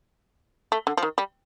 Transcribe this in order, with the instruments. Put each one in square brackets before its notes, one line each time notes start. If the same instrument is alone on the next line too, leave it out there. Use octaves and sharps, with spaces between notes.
[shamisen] A3
D3
F3
D#3
G3